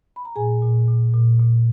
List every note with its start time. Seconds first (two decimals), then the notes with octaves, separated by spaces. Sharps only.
0.16 B5
0.25 A#5
0.36 A#2 G#4 G#5
0.62 A#2
0.88 A#2
1.13 A#2
1.40 A#2